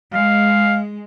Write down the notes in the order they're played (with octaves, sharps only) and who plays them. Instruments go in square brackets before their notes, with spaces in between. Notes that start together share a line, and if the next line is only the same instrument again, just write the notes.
[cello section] G#3 [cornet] F5